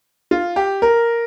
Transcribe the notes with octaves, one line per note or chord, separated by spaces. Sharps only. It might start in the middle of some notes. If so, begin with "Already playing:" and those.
F4
G4
A#4